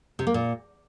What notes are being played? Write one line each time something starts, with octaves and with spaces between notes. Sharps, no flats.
C3
A#3
A#2